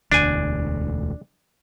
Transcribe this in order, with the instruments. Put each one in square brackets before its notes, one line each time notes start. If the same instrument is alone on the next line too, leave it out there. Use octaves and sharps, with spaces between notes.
[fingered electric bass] E1 D2 [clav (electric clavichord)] D4 G#5